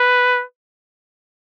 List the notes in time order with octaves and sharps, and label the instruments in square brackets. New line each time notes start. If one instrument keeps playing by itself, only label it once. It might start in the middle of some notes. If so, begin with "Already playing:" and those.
Already playing: [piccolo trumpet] B4